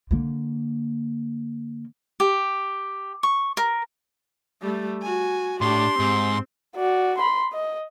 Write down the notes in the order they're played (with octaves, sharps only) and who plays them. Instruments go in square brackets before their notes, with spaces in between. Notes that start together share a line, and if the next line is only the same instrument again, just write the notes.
[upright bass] D3 A#3
[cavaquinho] G4
C#6
A#4
[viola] G3 A3
F#4 G#5
[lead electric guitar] A2 [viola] D4 G4 [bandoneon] C6
[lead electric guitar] G#2 [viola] C4
[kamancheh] F#4 D5
B5 C6
D#5